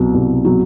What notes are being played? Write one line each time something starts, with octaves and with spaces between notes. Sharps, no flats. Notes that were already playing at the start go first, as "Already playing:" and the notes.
Already playing: C2 B2 F#3
C2
B2 F#3